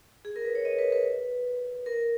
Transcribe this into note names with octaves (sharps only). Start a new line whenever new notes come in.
G#4
A#4
B4
C#5
D#5
B4
B4
A#4